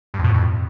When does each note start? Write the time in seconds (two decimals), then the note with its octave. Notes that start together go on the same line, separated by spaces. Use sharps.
0.14 G2
0.19 F2
0.24 B2
0.29 A2
0.34 F2